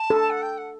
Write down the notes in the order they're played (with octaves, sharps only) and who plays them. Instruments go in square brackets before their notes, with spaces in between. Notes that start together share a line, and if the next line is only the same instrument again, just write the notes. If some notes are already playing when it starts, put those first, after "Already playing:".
Already playing: [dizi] A5
[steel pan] A4
[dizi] F#5
G5
F#5